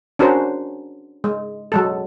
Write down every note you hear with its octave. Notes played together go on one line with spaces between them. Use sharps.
C#4 D4 F#4 A#4 C5
G#3
F#3 G#3 A4